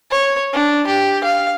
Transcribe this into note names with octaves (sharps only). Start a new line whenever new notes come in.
C#5
D4
G4
F5